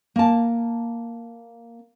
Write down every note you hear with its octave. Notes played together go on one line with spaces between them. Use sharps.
A#3 A5